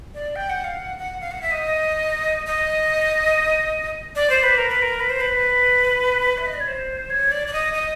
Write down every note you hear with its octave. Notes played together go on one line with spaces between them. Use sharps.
D5
G5
F#5
F5
F#5
F#5
F5
F#5
E5
D#5
D#5
D5
C5
B4
A#4
B4
A#4
B4
C5
B4
E5
D#5
D5
C#5
C5
C#5
D5
D5
D#5
D#5